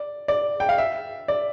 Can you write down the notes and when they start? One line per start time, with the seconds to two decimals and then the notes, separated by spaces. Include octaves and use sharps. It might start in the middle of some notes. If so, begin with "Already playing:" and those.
Already playing: D5
0.28 D5
0.60 G5
0.69 F5
0.78 E5
1.28 D5